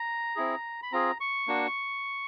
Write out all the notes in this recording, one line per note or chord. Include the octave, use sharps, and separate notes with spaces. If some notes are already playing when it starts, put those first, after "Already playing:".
Already playing: A#5
C4 E4 G#4
B5
C4 F4 G#4 A#5
C#6
A#3 D4 F#4